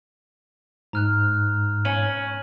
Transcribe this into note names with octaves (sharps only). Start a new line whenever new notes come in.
G#2 A#5 F6 F#6
C#4 D#7 F#7